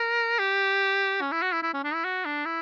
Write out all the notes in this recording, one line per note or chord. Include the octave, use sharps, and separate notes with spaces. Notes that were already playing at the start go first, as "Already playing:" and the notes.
Already playing: A#4
G4
C#4
E4
F#4
E4
E4
C#4
D4
E4
F#4
D4
E4